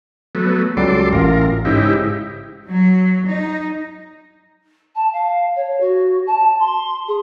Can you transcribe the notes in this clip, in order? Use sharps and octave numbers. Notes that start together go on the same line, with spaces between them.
F#3 A3 B3
C#2 F#3 G3 A4 C6 D6
A1 F4 A#4
G#2 C#3 D#4 E4 G4
F#3
D#4
A5
F5
C#5
F#4
A5
C6
G#4